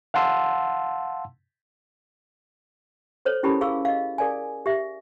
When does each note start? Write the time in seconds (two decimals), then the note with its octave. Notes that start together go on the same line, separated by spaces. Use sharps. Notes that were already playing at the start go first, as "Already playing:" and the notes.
0.14 F5 F#5 A5 C6 E6
3.25 A4 C5 C#5
3.43 C#4 E4 G4 A#4 A5 B5
3.61 G#4 F5 C#6 E6
3.85 D#5 F5
4.18 G#4 A#4 D5 F5 G#5
4.66 G4 E5